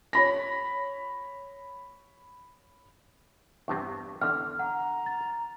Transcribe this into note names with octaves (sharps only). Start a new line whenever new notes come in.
C#5 B5 A#6
E2 G2 C3 C#6
E2 D3 F6
F#5 A#5
A6